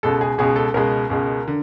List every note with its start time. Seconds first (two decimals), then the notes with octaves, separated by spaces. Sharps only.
0.03 C#2 B2 G#3 A4
0.21 G#4
0.38 C#2 B2 G#3 G#4
0.56 A4
0.74 C#2 B2 G#3 A#4
1.10 C#2 B2 G#3
1.48 D3